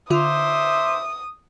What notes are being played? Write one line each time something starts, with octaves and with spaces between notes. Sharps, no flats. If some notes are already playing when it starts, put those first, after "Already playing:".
D3 D#4 F4 C5 E5 D6 D#6